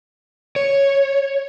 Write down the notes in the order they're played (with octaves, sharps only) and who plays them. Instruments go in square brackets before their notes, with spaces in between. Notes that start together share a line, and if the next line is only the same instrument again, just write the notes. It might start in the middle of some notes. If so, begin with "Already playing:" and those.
[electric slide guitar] C#5